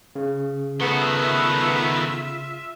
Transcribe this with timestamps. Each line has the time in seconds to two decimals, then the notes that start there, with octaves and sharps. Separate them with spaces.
0.16 C#3
0.80 D#3 A3 B3 F4 F#4 E5